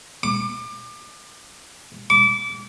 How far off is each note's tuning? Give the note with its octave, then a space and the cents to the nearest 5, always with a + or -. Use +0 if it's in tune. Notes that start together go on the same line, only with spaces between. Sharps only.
D6 +35
D6 -25